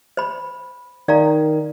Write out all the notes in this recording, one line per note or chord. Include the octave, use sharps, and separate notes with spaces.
C5 B5
D#3 D5 F5 A#5